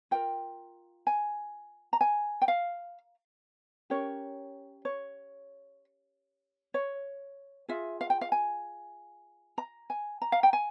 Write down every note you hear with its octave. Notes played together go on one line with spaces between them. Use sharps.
F4 A#4 G5
G#5
A#5
G#5
G5
F5
C#4 G4 A#4 C#5
C#5
C#5
F4 G#4 E5
F5
G5
F5
G#5
A#5
G#5
A#5
F5
G5
G#5